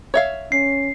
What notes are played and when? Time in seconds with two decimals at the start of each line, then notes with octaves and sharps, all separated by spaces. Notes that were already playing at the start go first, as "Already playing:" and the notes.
0.14 C#5 E5 F5
0.52 C#4 C7